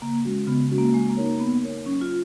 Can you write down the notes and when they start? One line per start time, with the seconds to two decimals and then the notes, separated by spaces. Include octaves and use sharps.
0.02 C#3 A#3
0.25 G#3 C#4 F#4
0.48 C#3 B3
0.71 G#3 C#4 F#4
0.78 A#3
0.94 G#3 A#3
1.09 A#3
1.17 D#4 A#4 C#5
1.25 A#3
1.40 A#3 B3
1.63 D#4 A#4 C#5
1.86 F#3 C#4
2.01 F4